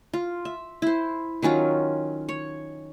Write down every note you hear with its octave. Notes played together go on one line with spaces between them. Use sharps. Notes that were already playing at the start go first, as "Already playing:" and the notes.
F4
E5
E4 C5
D#3 F#3 C#4 F4
C#5